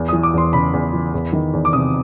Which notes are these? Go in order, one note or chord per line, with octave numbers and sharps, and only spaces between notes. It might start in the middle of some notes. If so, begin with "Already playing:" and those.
Already playing: E2
E3 D#6
D6
E2 C6
C#3 B5
E2
E3
E2
D#3
E2
D6
C3 D#6